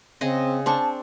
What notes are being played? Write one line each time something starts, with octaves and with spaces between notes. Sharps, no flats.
C#3 C4 G#4 D#5
C4 D4 A5 C#6